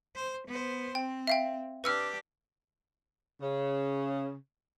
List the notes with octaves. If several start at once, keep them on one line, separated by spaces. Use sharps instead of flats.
C5
B3 C5
C4 G5
E5 F5 G5
D4 G4 B4 E6 F6
C#3